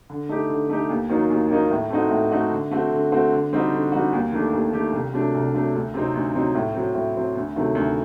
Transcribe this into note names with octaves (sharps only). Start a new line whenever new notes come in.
D3
A3 D#4 G4
D3
A3 D#4 G4
D#2
D#3 F#3 A#3 D#4
D#2
D#3 F#3 A#3 D#4
A2
A3 C4 D#4 F#4
A2
A3 C4 D#4 F#4
D3
A3 C4 F#4
D3
A3 C4 F#4
D3
G3 C4 D#4 F#4
D3
G3 C4 D#4 F#4
D#2
D#3 A3 D4 G4
D#2
D#3 A3 D4 G4
C2
C3 F#3 A3 D4
C2
C3 F#3 A3 D4
D2
C3 F#3 C4 D#4
D2
C3 F#3 C4 D#4
A2
F#3 C4
A2
F#3 C4
D2
C3 D#3 F#3 A3
D2